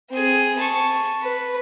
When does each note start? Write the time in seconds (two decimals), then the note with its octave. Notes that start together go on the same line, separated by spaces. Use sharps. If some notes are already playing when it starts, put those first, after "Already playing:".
0.10 C4 G#4
0.59 A5 C#6
1.22 B4